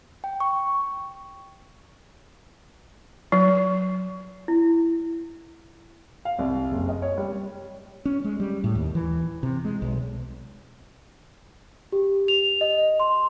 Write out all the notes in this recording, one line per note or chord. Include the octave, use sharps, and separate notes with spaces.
G5
C#6
F#3
E4
F5
C2
F#1
D#5
C#5
G3
C#4
G#3
G3
A2
D#2
E3
C3
G#3
B1
G4
F7
D#5
C6